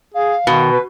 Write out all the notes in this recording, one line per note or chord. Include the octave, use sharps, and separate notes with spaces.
G#4 F5
B2 D#3
B4